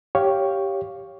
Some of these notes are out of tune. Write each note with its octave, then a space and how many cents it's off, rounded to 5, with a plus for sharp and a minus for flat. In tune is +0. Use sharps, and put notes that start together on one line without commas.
G4 +0 C#5 +0 F5 +0